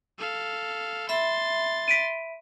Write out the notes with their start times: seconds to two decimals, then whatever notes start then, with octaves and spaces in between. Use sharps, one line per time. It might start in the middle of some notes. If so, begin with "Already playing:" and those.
0.19 A4 F5
1.09 E5 B5 C6 A6
1.88 B6 D7 D#7